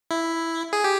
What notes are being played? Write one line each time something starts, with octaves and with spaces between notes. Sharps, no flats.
E4
G#4
G4